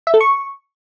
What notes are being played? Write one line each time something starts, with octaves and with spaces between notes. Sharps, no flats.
E5
A4
C#6